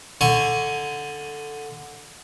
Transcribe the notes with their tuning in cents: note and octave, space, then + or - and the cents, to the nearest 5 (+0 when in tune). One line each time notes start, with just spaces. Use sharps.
D3 +0 G#5 +10 C#6 +0